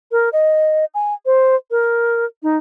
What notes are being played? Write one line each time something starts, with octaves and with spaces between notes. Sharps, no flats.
A#4
D#5
G#5
C5
A#4
D#4